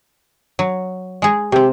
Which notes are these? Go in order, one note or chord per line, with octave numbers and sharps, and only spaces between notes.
F#3
G#3 G#4
C3 C4 G4